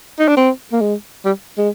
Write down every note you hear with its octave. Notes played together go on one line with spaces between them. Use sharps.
D#4
D4
C4
A#3
G#3
G3
G#3